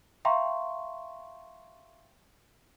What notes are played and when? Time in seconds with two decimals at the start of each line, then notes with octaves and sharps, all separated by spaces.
0.25 E5 F5 G5 A#5 C6 C#6